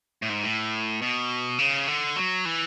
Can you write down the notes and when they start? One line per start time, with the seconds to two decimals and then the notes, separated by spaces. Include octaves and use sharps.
0.22 A2
0.29 G#2
0.44 A2
1.02 B2
1.59 C#3
1.88 D3
2.16 F#3
2.45 E3